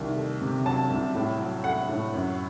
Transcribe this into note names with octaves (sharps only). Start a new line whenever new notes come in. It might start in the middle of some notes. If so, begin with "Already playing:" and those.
Already playing: C2 D#3
A3
C3
F#3 A5
C2
A2
F#3
A3 F#5
A2
F#2